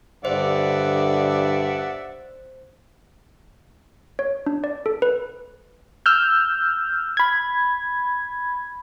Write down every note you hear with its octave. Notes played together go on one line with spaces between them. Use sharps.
G2 D3 C5 D5 E5 F#5
C#5
D4
D5
A4
B4
E6 F6 G6
B5 G#6